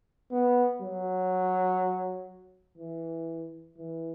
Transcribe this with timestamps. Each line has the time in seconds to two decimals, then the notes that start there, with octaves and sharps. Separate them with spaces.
0.31 B3
0.81 F#3
2.78 E3
3.77 E3